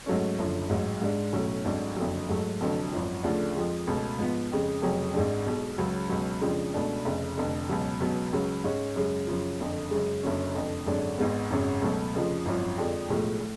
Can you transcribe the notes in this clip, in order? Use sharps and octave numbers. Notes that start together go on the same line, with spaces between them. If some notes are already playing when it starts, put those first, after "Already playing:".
G#2 F#3 A3 C#4
F#1 F#2 D3 F3
A1 G#2 F#3
G#2 G#3 D4
B1 A2 F#3 C#4
G#1 G#2 F#3 A3 D4
F#1 F2 D3 F#3
G#2 F#3 A3
F1 F2 D3 F#3 A3
G#1 F#2 F3
D2 C#3 F3 A3 D4
F2 F3 G#3
C#2 B2 A3
G#2 F3 B3
F2 C#3 G#3
F1 F2 C#3 F#3 C#4
G#1 G#2 G#3 D4
B1 B2 G#3
C#2 C#3 F#3
C#2 B2 F#3
F2 C#3 F3 G#3 D4
C#2 B2 A3 D4
F1 F2 C#3
F1 F2 D3
C#2 B2 F#3
C#2 B2 F#3 B3
C#2 C#3 F#3
G#2 G#3 C#4
F#2 C#3 G#3
F#2 C#3 F3
F#1 F2 D3
F#2 C#3 G#3
F#1 F#2 D3 F#3 C#4
F1 F2 D3
G#1 F#2 D3 G#3 D4
G#1 G#2 G#3 B3
G#1 F#2 C#3 F#3
C#2 B2 F#3 A3
F1 F2 C#3 F3
G#1 F#2 F3
F2 D3 F3 G#3 D4
B1 A2 F3 G#3
A2